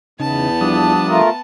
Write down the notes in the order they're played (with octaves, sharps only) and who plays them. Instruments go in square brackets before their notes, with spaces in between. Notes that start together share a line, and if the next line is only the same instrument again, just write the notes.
[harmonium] E2 [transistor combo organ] C#3 D#4 [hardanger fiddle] B3 A5
[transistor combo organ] F3 G3 D#6 [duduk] D4
[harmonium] A3 F4 A#4